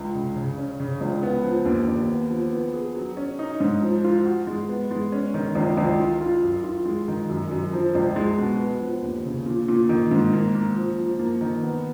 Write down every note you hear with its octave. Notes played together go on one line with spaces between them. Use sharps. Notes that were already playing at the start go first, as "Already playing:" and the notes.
Already playing: C#2
C#3
C#3
C#4
C#3
C#2
B3
F3
D#2
D#2
B3
F3
B3
G#4
F#3
C#4
D#4
G#2
F3
F4
F#4
G#3
B3
G#3
C#4
D#3
C#2
C#2
F4
F4
F#2
F4
G#3
D#3
F#2
F#2
F3
C#2
G#3
B2
B3
F3
D#2
C#3
A#2
A#2
D#3
G#2
A#3
A#3
F3
F3
A#3
D#3
B3